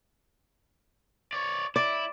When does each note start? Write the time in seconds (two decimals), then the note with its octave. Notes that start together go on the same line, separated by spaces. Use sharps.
1.33 C#5 D5
1.76 E4 D5